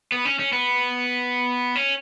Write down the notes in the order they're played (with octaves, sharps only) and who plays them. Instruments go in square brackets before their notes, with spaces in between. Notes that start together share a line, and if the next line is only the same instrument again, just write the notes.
[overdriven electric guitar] B3
C#4
C#4
B3
C#4